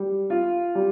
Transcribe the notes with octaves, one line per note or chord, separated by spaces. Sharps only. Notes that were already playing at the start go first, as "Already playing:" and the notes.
Already playing: G3
F4
G3